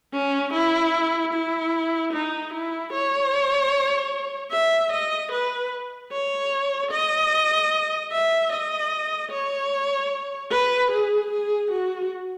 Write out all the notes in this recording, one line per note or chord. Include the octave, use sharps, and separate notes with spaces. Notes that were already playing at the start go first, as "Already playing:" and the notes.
C#4
E4
E4
D#4
E4
C#5
E5
D#5
B4
C#5
D#5
E5
D#5
C#5
B4
G#4
G#4
F#4